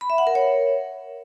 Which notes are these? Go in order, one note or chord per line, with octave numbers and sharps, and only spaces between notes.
B5
E5
F#5
A#4
C#5